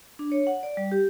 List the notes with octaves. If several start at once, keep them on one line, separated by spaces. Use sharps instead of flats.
D4
C#5
F#5
D5
G3
G4